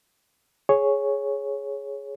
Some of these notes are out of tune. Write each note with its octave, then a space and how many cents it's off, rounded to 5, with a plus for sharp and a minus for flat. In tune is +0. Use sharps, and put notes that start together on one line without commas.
G#4 +0 C#5 +0